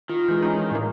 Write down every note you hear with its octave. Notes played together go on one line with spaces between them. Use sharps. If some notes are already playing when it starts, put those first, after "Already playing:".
D#3 F4
E3 G#3 G6
C#4 D#4
A2 G#3 A#3